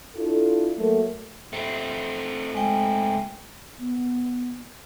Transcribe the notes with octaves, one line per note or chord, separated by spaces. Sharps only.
D4 E4 F4 A4
F#3 A3 A#3
A3 C4
G#3 G5
B3